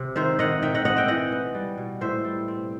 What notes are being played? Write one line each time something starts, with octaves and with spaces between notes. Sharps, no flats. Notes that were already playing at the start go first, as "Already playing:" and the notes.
Already playing: C3
D#3 C5 E5
D#3 D#5 F#5
D#3 E5 G5
D#5 F#5
C4 D#5 F#5
E5 G5
E3 D#5 F#5
B3
G3
B2
A2 C5 E5
G3
C4